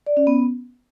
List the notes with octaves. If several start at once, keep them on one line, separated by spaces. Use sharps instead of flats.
D5
C#4
B3